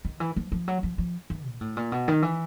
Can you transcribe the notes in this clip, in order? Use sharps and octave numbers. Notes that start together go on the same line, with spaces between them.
D#3
E3
F3
F3
F#3
F3
F3
E3
A#2
A2
A#2
B2
D#3
E3